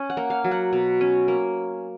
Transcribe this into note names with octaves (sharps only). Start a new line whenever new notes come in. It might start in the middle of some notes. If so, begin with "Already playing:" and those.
Already playing: C#4
F#5
A#3
F5
F#3
F#5
B2
C#4
A#3